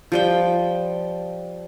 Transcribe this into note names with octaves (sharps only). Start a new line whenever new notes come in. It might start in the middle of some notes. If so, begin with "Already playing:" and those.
F3 G3 G5